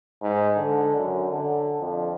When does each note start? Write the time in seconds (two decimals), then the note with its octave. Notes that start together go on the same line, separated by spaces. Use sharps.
0.22 G#2
0.57 D3
0.97 F#2
1.32 D3
1.81 F2